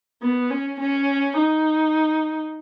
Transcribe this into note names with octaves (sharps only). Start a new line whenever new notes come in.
B3
C#4
C#4
D#4